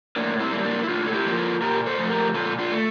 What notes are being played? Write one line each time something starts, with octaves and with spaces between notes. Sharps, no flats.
A2 A#3 D4
C4 E4
G3 A#3
A#3 D4
E4
A2 D4 F4
A4
E4 G4
F3 A#3
F4 A4
A#2 G4 A#4
A4 C5
F3 A3
G4 A#4
A#2 F4 A4
D4 F4
A3